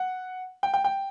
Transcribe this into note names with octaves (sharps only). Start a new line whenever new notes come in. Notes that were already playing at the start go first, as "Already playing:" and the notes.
Already playing: F#5
G5
G5
G5